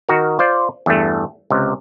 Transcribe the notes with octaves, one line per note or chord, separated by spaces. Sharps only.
D#3 F#4 A#4
F4 C5 D5
E2 G2 A3
C#2 C3